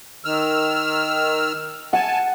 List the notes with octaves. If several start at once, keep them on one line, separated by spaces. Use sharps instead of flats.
D#3 E6 F6
F#5 G#5 A5